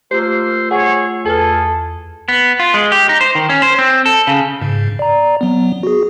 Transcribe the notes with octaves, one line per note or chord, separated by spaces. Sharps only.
A3 A#3 F4 G4 C5 E6
G#4 C#5 F#5
E2 G#4 A4 B4 F6
B3
F4
G#3
G4
D#4
C5
D#3
C#4
C5
C4
A4
C#3
G#2 C#3
D5 A#5
F#3 B3
F#4 G#4